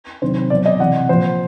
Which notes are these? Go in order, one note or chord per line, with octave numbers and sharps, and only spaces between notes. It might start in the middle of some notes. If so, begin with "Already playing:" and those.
C3 D#3 F#3 C5
B2 F#3 D5
D#5
C3 E3 F#5
A#2 F3 C5